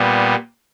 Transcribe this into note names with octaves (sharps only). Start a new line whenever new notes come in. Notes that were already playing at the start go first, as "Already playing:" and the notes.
Already playing: A#2 G3 B3